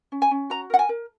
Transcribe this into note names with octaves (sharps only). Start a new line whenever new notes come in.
C#4
G#5
C#4
F#4 A#5
A#4 F#5
G#5
A#4